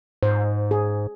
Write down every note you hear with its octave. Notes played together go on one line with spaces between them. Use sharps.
G#2 C5
G#4